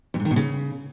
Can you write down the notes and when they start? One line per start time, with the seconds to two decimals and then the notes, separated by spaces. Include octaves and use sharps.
0.14 F2
0.20 G#2
0.25 D#3
0.31 B2
0.36 C#3